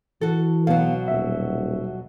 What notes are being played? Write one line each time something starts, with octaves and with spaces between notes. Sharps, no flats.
E3 F#4 A4
B2 F#3 B3 F5
D#1 E5